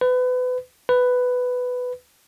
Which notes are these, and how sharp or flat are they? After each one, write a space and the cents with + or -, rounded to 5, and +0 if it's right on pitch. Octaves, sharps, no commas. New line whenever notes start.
B4 +30
B4 +10